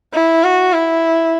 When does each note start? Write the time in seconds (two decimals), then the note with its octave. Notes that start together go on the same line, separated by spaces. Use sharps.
0.13 E4
0.44 F#4
0.73 E4